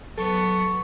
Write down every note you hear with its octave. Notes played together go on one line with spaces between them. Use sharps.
F#3 B3 A4 C#6